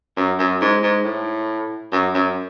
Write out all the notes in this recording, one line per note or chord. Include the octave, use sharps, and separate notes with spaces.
F#2
F#2
G#2
G#2
A2
F#2
F#2